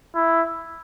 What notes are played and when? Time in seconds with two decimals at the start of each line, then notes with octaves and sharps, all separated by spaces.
0.15 E4